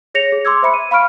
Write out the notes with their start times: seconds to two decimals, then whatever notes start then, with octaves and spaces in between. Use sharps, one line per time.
0.14 G#4 C#5 A#6 C#7 F7
0.32 G#4
0.45 C6 D6 E6 G#6
0.63 C5 E5 B5 C#7
0.74 D#7
0.91 F5 B5 C#6 F6 D7